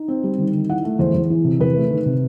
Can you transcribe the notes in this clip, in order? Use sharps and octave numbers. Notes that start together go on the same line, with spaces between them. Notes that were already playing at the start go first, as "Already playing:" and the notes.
Already playing: D#4
C4
G3
D#3
D#3
E4 F#5
A3
E2 C5
E2
E3
C3
E2 B4
A3
D#3
C3